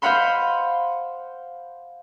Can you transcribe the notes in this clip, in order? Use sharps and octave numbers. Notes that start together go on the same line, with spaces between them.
C5 D#5 F5 F#5 B5 C6